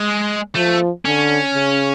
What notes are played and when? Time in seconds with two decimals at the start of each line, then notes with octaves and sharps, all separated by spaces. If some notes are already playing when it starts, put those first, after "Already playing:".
Already playing: G#3
0.55 F3 A3
1.05 D3 C#4
1.54 C#3